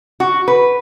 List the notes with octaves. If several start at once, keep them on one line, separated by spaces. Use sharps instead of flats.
F#4
B4